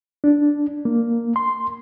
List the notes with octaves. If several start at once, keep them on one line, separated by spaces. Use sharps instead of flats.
D4
A#3
C6